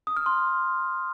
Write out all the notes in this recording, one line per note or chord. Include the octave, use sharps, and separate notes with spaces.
D#6
F6
C6